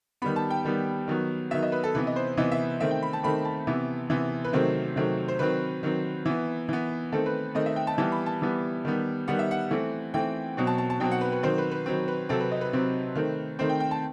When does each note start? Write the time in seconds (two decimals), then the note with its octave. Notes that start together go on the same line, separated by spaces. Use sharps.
0.22 D#3 G3 B3 B5
0.36 A5
0.50 G5
0.64 D#3 G3 B3
1.08 D#3 F#3 B3
1.51 D#3 F#3 B3 E5
1.63 D#5
1.72 B4
1.84 A4
1.95 C3 E3 B3 B4
2.07 D#5
2.16 C5
2.37 C3 E3 B3 D#5
2.52 E5
2.80 D#3 A3 C4 E5
2.91 G5
3.03 B5
3.13 A5
3.23 D#3 A3 C4 B5
3.45 A5
3.67 C3 E3 B3
4.10 C3 E3 B3
4.45 B4
4.53 C3 D#3 F#3 A3 C4 C5
4.96 C3 D#3 F#3 A3 C4
5.28 C5
5.39 D#3 F#3 C4 B4
5.83 D#3 F#3 C4
6.26 E3 B3
6.69 E3 B3
7.12 D#3 A3 C4 A4
7.26 B4
7.55 D#3 A3 C4 D#5
7.66 E5
7.76 G5
7.87 A5
7.98 E3 G3 B3 A5
8.12 B5
8.26 A5
8.42 E3 G3 B3
8.85 D#3 G3 B3
9.28 D#3 G3 B3 F#5
9.39 E5
9.51 F#5
9.71 E3 A3 C4
10.14 E3 A3 C4 G5
10.57 B2 F#3 C4
10.67 A5
10.78 A5
10.90 A5
11.00 B2 F#3 C4 G5
11.11 F#5
11.21 B4
11.32 B4
11.43 D#3 F#3 C4 C5
11.58 B4
11.71 B4
11.86 D#3 F#3 C4
12.08 B4
12.29 C3 F#3 C4 A4
12.40 B4
12.52 D#5
12.61 B4
12.73 C3 F#3 C4
13.15 D#3 A3 C4
13.59 D#3 A3 C4 C5
13.69 G5
13.80 G5
13.91 A5